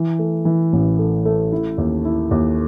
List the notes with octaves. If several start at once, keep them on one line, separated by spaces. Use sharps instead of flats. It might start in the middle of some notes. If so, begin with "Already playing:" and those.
Already playing: E3
A3
E3
A1
A3
A3
E4
D#2
E4
D#2